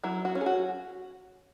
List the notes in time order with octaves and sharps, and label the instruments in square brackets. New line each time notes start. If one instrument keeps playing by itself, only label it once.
[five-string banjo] F#3 E4
F#4
C#4
G#4
F#4